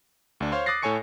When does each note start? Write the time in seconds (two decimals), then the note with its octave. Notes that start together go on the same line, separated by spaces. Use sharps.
0.40 D2 D4
0.52 C5 C#5 F5 C6
0.66 D6 D#6 F#6 A6 A#6 C7
0.82 A2 A4 C#5 G#5 C#6 C#7